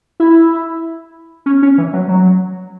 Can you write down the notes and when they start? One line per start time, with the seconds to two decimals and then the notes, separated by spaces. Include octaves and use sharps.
0.20 E4
1.46 C#4
1.62 C#4
1.78 E3
1.93 F#3
2.09 F#3